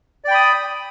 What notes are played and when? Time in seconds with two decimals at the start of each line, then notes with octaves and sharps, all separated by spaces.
0.24 D5
0.28 G5
0.31 B5
0.34 D#6